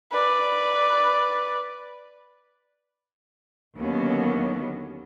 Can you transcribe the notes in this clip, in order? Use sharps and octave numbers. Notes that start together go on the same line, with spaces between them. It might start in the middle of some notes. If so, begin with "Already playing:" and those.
B4 D5
D#2 D3 F#3 B3 C#4